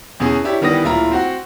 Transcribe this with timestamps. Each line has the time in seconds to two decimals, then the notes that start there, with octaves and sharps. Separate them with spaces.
0.20 E2 B2 C#4 G#4
0.44 D4 E4 G4 C#5
0.61 D#3 E3 G3 B3 D#6 A#6
0.84 D1 A#2 E4 F4 A#5
1.12 C4 F#4 F#5